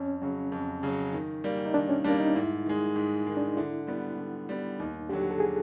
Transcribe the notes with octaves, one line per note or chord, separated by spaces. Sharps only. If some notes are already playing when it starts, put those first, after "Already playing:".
Already playing: F2 C#4
C#3 F#3
F2
C#3 F#3
D#3
G3 A#3
D#4
D#3 D4
C#4
G3 A#3 D4
D#4
G#2 E4
D#3 G#3
G#2
D#3 G#3
D4
D#4
D3 E4
G3 B3
D3
G3 B3
D#2 D#4
D3 F#3 G4
A4
G#4